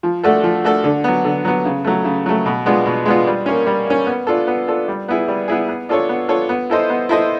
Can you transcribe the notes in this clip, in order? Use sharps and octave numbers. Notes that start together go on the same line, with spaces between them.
F3
A3 D4 F#4 A4
F3
A3 D4 F#4 A4
D3
F#3 B3
D3
F#3 B3
C#3
F#3 A3
C#3
F#3 A3
B2
G#3 B3 D4 F4
B2
G#3 B3 D4 F4
G3
A#3 C#4
G3
A#3 C#4
B3
D4 F4 A4
B3
D4 F4 A4
G3
B3 E4 G#4
G3
B3 E4 G#4
B3
D4 F4 A4 C#5
B3
D4 F4 A4 C#5
B3
E4 A4 C5 D#5
B3
E4 A4 C5 D#5